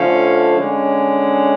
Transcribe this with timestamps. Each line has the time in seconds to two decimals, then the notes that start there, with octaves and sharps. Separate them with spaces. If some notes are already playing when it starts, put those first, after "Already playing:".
Already playing: D3 F3 A3 C#4 C#5 F5
0.55 D3 G#3 C#4